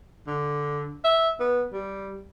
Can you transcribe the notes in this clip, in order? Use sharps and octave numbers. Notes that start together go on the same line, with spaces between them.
D3
E5
B3
G3